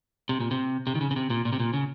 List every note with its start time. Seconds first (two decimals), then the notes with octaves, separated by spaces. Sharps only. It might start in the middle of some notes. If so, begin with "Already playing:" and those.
0.29 C3
0.40 A#2
0.51 C3
0.87 C3
0.95 D#3
1.01 C#3
1.11 C#3
1.16 C3
1.30 A#2
1.45 A#2
1.53 C3
1.60 A#2
1.74 C#3